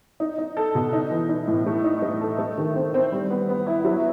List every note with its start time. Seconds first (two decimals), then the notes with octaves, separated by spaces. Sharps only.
0.20 D#4
0.38 D#4
0.57 A4
0.75 B2
0.93 D#4
1.11 E3
1.29 D#4
1.47 A2
1.66 A3
1.84 D#4
2.02 A3
2.21 A4
2.38 A3
2.58 D#3
2.75 C4
2.94 C4
3.12 G3
3.30 B3
3.49 B3
3.67 E4
3.85 F#3